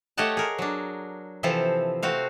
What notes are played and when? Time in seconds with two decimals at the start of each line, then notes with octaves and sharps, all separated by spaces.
0.18 A3 G4 C#5 D#5 F#5 A5
0.37 G#4 A#4
0.59 F#3 D4
1.43 C3 E3 F3 C4 A4
2.03 A3 C4 F#4 F5